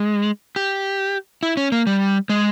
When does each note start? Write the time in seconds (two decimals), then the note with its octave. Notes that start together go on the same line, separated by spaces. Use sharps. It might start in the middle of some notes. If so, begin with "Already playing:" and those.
Already playing: G#3
0.56 G4
1.43 E4
1.57 C#4
1.72 A#3
1.87 G3
2.29 G#3